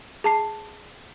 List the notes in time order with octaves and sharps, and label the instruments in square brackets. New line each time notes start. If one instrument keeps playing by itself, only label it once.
[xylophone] G#4 A5 C7